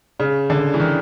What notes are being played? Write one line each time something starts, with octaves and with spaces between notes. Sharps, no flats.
C#3
D3
E3
D#3